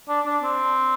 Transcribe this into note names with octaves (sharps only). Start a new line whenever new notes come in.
D4
D4
C4